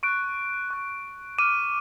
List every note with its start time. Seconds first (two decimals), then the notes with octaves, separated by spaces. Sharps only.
0.03 C#6 F#6 D7
0.70 C#6 F#6
1.38 D6 F6 D#7